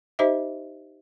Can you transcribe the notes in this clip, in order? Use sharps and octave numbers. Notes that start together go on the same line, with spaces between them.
D#4 G4 C5 D#5 E5